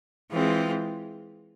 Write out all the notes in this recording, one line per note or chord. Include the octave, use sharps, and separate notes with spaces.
E3 G#3 C4 F4